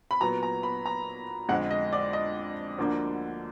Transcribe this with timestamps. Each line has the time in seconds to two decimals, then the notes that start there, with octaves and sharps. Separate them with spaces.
0.11 B5
0.21 A#2 F#3 B3 A#5
0.43 A#5
0.63 B5
0.86 A#5
1.49 F2 D3 G#3 F#5
1.71 D#5
1.93 D5
2.13 D#5
2.78 D2 D3 F3 A#3 D4